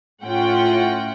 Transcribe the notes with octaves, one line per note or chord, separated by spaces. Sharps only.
A2 C#4 F4 F#5 G5